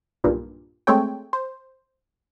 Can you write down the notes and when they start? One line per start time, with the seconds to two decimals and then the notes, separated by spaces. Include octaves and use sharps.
0.24 B1 G2 A#2
0.87 G#3 A3 C4 C#5 G5
1.33 C5